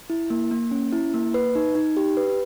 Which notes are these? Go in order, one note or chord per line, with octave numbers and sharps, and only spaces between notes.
E4
A#3
A#3
C#4
E4
A#3
B4
D#4
D#4
G4
B4